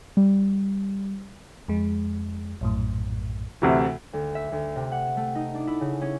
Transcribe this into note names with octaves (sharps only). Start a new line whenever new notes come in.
G3
F2 G#3
A#1 F#2 A2
D2 C3 E3
D2
E5
D2
C3
F#5
A3
D#4
D4
E4
C#3
C#4